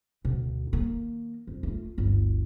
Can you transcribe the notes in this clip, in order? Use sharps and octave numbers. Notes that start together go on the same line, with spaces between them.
D2 B2
D#3 A#3
F2
A3 F4
G1 D2